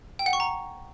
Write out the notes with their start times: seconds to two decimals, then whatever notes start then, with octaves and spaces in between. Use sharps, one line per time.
0.19 G5
0.26 F#5
0.33 C#6
0.40 A#5